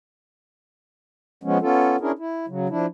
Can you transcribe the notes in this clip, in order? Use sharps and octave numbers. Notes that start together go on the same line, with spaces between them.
F3 G#3 B3 C#4
B3 C#4 F4 A4
C#4 D4 E4 G#4 A#4
E4
C#3 F#3
F3 D4 E4